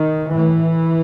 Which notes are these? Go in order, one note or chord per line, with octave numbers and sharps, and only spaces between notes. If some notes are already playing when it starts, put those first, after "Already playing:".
Already playing: D#3
A2 E3